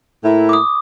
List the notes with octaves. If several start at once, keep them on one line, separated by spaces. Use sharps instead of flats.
A2 A#3 E4
D6 D#6